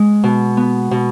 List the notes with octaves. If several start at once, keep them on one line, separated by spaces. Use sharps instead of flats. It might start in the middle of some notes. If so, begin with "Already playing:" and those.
Already playing: G#3
B2
B3
B2